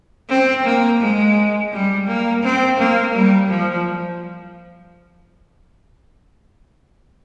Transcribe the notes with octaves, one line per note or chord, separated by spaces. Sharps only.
C4
A#3
G#3
G3
A#3
C4
A#3
G3
F3